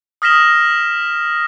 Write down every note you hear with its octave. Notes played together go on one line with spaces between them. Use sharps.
D#6 F6 A#6 B6 E7 G7